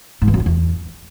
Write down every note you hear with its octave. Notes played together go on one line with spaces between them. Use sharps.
G#2
E3
F#2
D#3
E2